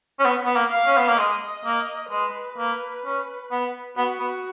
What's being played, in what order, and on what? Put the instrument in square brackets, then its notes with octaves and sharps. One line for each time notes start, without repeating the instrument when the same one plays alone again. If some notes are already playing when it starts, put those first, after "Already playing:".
[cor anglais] C#4
B3
B3
A#3
[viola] F5
[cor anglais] C#4
B3
A#3
[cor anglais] G#3 [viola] D#5
[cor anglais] A#3
[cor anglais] G#3 [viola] B4
[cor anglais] A#3
C#4
B3
[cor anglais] B3 [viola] F#4
[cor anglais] B3